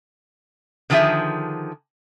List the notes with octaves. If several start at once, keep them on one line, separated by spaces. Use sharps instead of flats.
D3 D#3 F3 A#3 G#4 E5